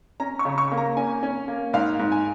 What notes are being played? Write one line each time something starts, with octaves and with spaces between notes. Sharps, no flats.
C#4 A#5
C#6
C#3
C#6
A#3
A#5
C#4 G#5
C#4
A#3
G#2 F5
G#2
G#5